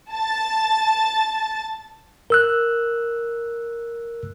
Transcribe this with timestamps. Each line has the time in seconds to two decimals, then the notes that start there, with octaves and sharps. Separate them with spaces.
0.13 A5 A6
2.30 A#4 E6 F#6